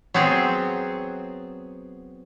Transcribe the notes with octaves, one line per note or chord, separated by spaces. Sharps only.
F#3 B3 C4 G#4